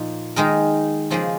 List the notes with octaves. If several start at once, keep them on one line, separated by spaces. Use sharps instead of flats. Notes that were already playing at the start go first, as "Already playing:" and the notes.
Already playing: A#2 F3 A#3 D#4
D#3 G#3 D#4 A#4
C#3 F3 A#3 D#4 G#4